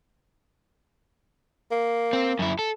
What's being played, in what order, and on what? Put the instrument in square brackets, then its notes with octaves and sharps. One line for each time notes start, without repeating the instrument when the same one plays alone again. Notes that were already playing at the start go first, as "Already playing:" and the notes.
[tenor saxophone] A#3
[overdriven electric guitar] C4
F#2 E4
A4